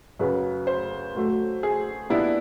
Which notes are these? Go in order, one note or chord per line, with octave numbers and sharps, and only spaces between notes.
F#2 C#3 F#3 B4
C5
A2 F#3 A3
G#4
A#2 G3 B3 D4 E4